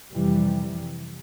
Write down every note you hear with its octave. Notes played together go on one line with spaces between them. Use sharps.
F2 C3 E3 G3